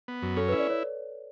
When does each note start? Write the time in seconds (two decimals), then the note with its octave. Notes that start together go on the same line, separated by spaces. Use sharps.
0.08 B3
0.22 F#2
0.36 C#4 A4
0.49 B4
0.52 E4
0.59 D5
0.70 C#5